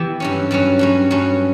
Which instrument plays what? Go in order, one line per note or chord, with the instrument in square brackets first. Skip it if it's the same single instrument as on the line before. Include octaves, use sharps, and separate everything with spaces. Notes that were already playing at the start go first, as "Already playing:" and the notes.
Already playing: [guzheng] E3 B3 E4 G4
G2 F#3 C#4
G2 F#3 C#4
G2 F#3 C#4
G2 F#3 C#4